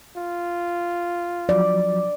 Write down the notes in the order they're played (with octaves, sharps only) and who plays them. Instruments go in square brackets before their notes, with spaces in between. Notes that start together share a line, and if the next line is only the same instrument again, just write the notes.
[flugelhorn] F4
[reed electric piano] F3 F#3 [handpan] D5